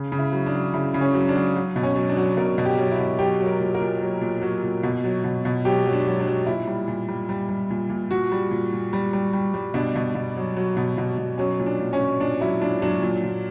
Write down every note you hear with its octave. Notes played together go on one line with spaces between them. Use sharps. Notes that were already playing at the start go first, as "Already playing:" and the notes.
Already playing: C#3
C#3
E4
F#3
D4
F#3
C#3 E4
C#3
C#4
F#3
D4
F#3
F#3
B2
C#4
F#3
D4
F#3
B2 A#4
B2
G4
F#3
E4
B2
F#3 G4
F#3
A#4
A#2
A#4
A#2
F#3
A#2
F#3
A#2
B2
F#3
B2
B2
F#3 G4
F#3
D4
F#3
D4
F#3
A#2 E4
G3
A#2
G3
G3
G3
A#2
A#2
A#2 F#4
G3
A#2
A#2
G3
G3
G3
G3
B2 D4
B2
B2
F#3
F#3
B2
B2
B2
F#3 C#4
A#2
D4
A#2
C#4
A#2
A#2 D4
F#3 E4
A#2 D4
F#3 D4
A#2
A#2